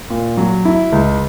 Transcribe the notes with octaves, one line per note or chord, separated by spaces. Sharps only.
A#2
F#3
E4
C#2